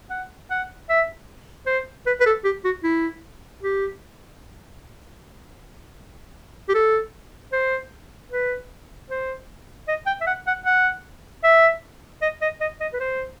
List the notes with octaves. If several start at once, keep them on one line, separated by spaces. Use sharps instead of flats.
F#5
F#5
E5
C5
B4
B4
A4
G4
F#4
E4
G4
G4
A4
C5
B4
C5
D#5
G5
E5
F#5
F#5
F#5
E5
D#5
D#5
D#5
D#5
B4
C5